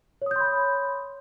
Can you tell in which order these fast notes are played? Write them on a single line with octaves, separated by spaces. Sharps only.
C#5 D#6 G6 C6 B5